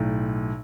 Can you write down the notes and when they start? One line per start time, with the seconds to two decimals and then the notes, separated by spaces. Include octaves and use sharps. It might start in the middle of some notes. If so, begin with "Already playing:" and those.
Already playing: B1 A2